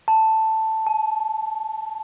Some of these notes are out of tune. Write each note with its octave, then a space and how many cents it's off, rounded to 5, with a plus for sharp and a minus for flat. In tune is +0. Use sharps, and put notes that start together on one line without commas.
A5 +5
A5 -40